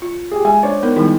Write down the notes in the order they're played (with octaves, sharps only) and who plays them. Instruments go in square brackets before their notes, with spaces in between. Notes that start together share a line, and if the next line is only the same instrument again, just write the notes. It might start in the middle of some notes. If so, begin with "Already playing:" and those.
[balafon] F4
[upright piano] G4 G#4
[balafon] G#3 [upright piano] G#5
[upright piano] D4 C5 C#5
[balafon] B3 D#4 A#4
[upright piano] D#3 G#3 [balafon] G3 D#4 E4